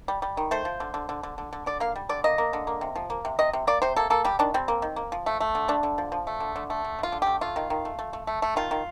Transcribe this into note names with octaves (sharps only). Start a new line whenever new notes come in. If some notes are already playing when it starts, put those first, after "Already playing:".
G3
G3
D#3
A3 C5
F3
D3
D3
D3
D3
D3
D3
D3 D5
A#3 F5
G3
D3 D5
A#3 D#5
A#3
D3
A#3
C3
F3
A#3
C3
C3 D#5
C3
A#3 D5
C3 C5
A#3 A4
A#3 A4
G3 G4
D#3 D4
G3 C4
A#3
D#3
A#3
F3
A3
A3
D3
D3 D4
D3
F3
F3
A3
D3
D3
A3
D3
D3
F4
D3
A3 G4
A3 F4
D#3
D#3
A3
A3
A3
A3
A3
D#3 F4
D#3